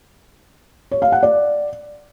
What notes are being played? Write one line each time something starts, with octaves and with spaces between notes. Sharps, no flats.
C#5
F5
F#5
D5